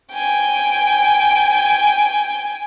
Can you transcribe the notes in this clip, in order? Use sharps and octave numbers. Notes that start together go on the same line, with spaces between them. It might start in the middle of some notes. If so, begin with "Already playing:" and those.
G5 G#5